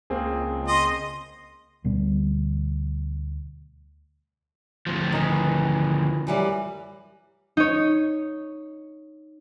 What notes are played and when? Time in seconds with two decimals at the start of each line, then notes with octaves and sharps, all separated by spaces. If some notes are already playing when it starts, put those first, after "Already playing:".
0.10 C#2 A#3 C4 G#4
0.68 D#5 C6
1.84 D2 B2 G3 C4
4.87 D2 F3
5.12 D#3 E3
6.27 F#2 E3 G3
7.57 D#4 C#5